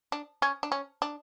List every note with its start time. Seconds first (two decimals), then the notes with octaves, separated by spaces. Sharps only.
0.12 D4
0.42 C#4
0.63 D4
0.72 C#4
1.02 D4